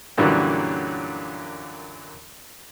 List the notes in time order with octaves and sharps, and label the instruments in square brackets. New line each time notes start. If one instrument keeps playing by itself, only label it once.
[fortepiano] F#2 A#2 D3 E3 F#3 G3